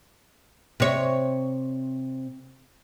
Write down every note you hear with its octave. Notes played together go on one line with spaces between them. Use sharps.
C3 C#5